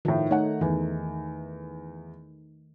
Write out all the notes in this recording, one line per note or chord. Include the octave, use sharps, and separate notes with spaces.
A2 D#3 F3
A3 D#4 C#5 F#5
E2 D#3